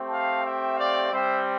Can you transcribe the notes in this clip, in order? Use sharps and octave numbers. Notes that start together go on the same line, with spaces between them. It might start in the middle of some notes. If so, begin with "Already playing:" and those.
Already playing: A3 C4 G4
F5 A5
E5 G5
D5 F5
G3 C4 G4 C5 E5